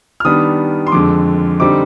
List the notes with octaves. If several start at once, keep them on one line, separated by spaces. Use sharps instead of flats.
F6
D#3 G3 B3 D4 D#6
C6
F2 D3 G#3 D6
D3 G3 C4 D#4 D6